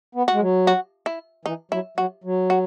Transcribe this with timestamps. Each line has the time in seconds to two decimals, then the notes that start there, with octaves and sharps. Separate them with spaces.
0.15 B3
0.28 F#4
0.33 G#3
0.41 F#3
0.67 F#4
1.06 E4
1.45 E3 D#4
1.71 F#3 E4
1.97 F#3 F#4
2.24 F#3
2.50 F#4